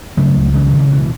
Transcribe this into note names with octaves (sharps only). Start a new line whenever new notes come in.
C#3 F#3 A3
C#2
C#3 E3 G#3
D#3 F#3
C#2
E3
B2 E3